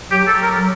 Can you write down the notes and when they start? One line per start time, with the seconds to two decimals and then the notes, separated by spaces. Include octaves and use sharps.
0.10 F#3 G4
0.27 A4
0.43 A#4
0.59 F#3